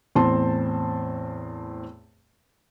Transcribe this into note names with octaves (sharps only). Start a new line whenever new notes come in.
E2 A2 C4 C5 A5 C6